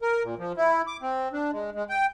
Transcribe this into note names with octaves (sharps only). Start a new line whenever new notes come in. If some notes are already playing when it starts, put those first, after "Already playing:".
A#4
A#2
F3
E4
D6
C4
D4
G#3
G#3
G5